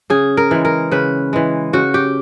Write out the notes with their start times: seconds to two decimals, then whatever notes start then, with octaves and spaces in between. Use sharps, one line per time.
0.10 C#3 G#4
0.37 A#4
0.51 E3 G#3
0.65 A#4
0.92 C#3 B4
1.33 E3 G#3
1.73 C#3 F#4
1.94 G4